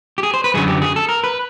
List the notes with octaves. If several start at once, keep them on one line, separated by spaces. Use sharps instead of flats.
G4
G#4
C5
B4
F#2 D3 F#3 G#4
G4
G#4
A4
A#4
B4